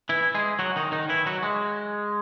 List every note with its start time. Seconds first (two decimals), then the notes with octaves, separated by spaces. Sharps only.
0.09 E3 E4
0.35 G#3 G#4
0.59 F#3 F#4
0.76 D#3 D#4
0.92 D#3 D#4
1.09 E3 E4
1.26 F#3 F#4
1.43 G#3